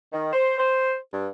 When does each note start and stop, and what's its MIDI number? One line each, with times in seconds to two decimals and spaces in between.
0.13 0.32 51
0.33 0.57 72
0.57 0.95 72
1.12 1.27 43